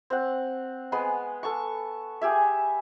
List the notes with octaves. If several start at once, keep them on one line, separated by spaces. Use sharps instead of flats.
C4 F#5
G#3 B3 B4 C6
A4 C#6
G4 G#4 E5